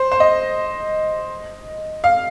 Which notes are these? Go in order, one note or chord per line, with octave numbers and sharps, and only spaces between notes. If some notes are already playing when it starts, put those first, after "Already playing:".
Already playing: C5
C5
D#5
F5